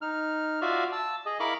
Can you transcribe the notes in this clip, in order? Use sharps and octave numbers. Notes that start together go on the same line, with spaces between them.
D#4 F6
F4 F#4 D5 E5 F5
A5 E6
G#4 D#5
E4 A#4 F5 B5 C#6 D6